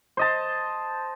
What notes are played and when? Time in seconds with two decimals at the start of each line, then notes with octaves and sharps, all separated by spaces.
0.17 C5 D#5 A5